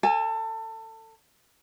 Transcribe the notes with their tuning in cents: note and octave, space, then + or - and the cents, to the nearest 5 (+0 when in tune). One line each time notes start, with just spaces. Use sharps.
A4 +25 G#5 -20